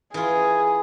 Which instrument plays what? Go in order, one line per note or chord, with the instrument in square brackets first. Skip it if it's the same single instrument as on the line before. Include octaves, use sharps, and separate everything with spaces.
[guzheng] E3 F4 [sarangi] G#4